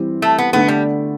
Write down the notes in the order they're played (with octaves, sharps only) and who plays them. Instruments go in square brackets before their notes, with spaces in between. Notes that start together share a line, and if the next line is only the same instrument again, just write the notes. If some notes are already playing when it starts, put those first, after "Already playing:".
Already playing: [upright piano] E3 G3 C4 G4
[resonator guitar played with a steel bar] A3
B3
[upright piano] D3 A3 D4 [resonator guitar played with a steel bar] B3
[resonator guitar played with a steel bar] G3